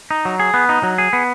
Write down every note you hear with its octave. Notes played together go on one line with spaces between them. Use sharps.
D#4
F#3
G#4
B3
D#4
F#3
G#4
B3